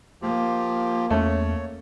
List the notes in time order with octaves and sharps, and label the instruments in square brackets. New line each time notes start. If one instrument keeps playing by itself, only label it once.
[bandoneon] F3 F4 G4 [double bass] A#3
[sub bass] E2 [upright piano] A3 C#4 [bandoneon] C#5